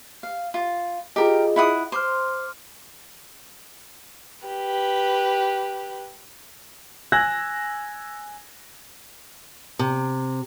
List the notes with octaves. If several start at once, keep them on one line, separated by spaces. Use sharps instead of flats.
F5
F4
F4 G4 G#4 A#4 D#5
E4 F#5 D#6
C5 C6 D6 F6
G4 B4
G#5 E6 F#6 G#6 A#6
C3